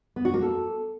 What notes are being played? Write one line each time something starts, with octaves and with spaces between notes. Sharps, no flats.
B3
F#4
A#3
A4